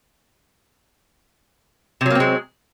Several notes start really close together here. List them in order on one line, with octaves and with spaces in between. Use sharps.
C3 F#3 A#3 C4 G#3